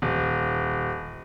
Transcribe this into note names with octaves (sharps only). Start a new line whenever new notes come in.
D#1